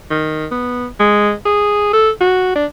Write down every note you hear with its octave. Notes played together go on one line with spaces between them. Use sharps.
D#3
B3
G#3
G#4
A4
F#4
D4